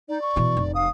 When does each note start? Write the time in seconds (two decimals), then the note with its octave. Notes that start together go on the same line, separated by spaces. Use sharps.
0.09 D#4 D5
0.22 C#6
0.36 B2 E3
0.57 F1
0.75 F5 D#6